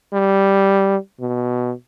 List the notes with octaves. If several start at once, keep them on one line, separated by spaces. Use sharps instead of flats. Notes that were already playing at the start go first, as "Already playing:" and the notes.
G3
B2